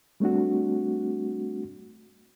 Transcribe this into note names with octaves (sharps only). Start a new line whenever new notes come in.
G3 A3 C4 D4 F#4